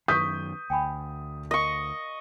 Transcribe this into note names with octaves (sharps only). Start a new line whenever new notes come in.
F#2 D#3 B4 C#6 D#6 G6 B6
D2 G5 G#5 B5
A#4 D#5 C#6